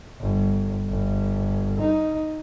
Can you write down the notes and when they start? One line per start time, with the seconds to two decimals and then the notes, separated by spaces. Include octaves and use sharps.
0.21 G1
0.89 G1
1.80 D#4